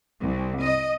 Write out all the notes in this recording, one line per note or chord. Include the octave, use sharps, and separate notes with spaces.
C2
D#5